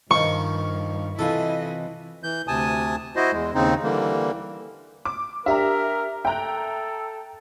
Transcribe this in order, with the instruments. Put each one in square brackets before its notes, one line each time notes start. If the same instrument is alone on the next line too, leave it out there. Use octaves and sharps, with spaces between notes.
[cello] G2 [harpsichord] D#3 F3 [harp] C#6
[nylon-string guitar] C3 E3 F4 [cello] E4 D#5 [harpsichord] A4
[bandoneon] E3 G6
D2 C3 G#5 A5 D#6
E4 F#4 C5 D#5
E2 G#3
D#2 C#3 C4 D#4
D3 E3 G3 A#3
[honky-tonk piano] D6
[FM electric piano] D4 G4 [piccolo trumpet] A#4 [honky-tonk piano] E5 A#5
[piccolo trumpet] A4 [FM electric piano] E5 [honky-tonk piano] G5 A#5 F#6